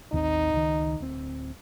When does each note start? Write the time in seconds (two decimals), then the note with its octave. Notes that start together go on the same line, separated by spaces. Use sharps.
0.12 A1 D#2 C4 D#4
0.53 C#2 D#3
1.00 D1 C4